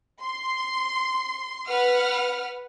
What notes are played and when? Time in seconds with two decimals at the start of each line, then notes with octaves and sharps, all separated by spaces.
0.21 C6
1.68 B4 F#5 F6